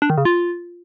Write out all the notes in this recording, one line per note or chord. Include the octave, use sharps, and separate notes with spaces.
D4
D#3
C#3
F4